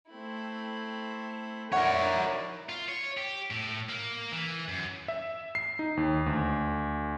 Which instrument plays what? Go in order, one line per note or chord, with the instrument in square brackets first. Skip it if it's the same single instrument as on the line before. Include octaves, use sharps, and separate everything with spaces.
[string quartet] A3 C4 E4
[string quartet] D#4 E4 D5 [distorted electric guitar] A#4 C#5 [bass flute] E5 [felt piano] F#5
[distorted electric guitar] F4
C#5
G4
A2
A#3
E3
F#2
[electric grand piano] E5
C7
D#4
D#2
D2